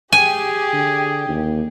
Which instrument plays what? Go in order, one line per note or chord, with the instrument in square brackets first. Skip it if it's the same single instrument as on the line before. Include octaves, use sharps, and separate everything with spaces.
[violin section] G4 [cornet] G#4 [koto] G#5
[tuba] D3
D#2